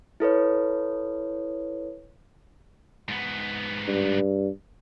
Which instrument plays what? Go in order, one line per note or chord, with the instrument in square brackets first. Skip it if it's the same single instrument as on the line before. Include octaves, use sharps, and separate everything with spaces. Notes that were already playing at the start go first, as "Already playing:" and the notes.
[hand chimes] E4 A4 B4 C#5
[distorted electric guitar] G#2 B3
[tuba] G2